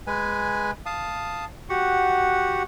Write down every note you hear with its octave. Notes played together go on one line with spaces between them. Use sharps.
G#3 B4 G#5
F5 A5 D#6
F#4 G4 F#5